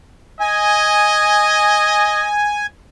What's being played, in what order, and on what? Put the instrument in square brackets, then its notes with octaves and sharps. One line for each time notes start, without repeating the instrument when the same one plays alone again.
[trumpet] D#5 [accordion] G#5